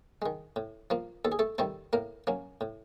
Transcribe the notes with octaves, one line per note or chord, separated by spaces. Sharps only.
D#3 G#3
A2
F3 A#3
D#2 A4
G#4
A3 A4
D#3 G3 A3 C4 A4
A2 A#3 A#4
F#3 A#3 C#4
A2